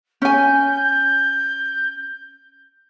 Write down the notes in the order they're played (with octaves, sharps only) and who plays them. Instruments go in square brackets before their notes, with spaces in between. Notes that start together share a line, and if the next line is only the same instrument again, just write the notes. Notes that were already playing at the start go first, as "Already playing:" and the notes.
[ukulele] C#4 G#5 [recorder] G6